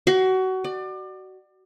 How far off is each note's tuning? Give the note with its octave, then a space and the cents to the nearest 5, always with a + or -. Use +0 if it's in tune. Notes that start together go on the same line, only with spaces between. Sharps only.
F#4 +25
D5 +30